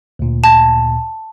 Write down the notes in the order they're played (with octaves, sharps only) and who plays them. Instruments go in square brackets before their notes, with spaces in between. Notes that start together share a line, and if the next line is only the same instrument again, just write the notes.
[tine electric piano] D2 A#2
[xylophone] A5